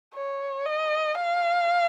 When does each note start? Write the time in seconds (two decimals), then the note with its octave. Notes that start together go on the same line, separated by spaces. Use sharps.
0.14 C#5
0.66 D#5
1.15 F5